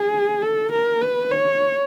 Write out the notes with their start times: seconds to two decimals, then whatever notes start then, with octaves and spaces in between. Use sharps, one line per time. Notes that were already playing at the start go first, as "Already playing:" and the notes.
Already playing: G#4
0.42 A4
0.72 A#4
1.02 B4
1.31 C#5